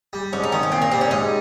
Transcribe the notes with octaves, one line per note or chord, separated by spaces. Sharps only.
G3
G#2 C#4
D#4
D#3 C#4
C#4
A#2 C4
A#3
G3 C4
C#4
G#2 D#4